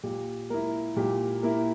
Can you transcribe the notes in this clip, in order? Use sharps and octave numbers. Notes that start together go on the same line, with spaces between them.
A#2 G4
A#3 E4 A#4
A#2 G4
A#3 E4 A#4